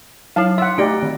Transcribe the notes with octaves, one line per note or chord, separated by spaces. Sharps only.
F#3 E4 F5 A5
E5 F#5 C6
A3 D#4 G4 D5 A#6 D7
D#3